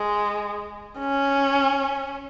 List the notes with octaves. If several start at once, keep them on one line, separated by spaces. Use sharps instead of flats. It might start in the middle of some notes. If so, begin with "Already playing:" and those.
Already playing: G#3
C#4